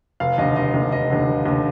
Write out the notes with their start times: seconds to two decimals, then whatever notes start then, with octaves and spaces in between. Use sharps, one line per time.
0.20 F1 F5
0.38 D#2 D3 D#5
0.56 F1 D#5
0.74 D#2 D3
0.92 F1 D#5
1.10 D#2 D3
1.28 F1
1.46 D#2 D3